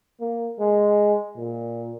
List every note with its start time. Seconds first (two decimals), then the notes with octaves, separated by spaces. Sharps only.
0.20 A#3
0.60 G#3
1.37 A#2